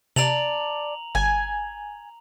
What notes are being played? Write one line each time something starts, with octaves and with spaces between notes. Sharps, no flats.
C3 D5 A5 A#5 F7 F#7
G1 G#5